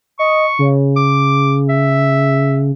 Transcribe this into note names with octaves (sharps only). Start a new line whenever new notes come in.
D#5 C#6
C#3
D6
E5